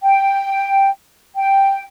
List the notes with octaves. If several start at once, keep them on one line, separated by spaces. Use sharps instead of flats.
G5
G5